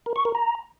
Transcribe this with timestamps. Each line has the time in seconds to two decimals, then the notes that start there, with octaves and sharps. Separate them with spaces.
0.06 A#4
0.16 C#6
0.25 A#4
0.35 A#5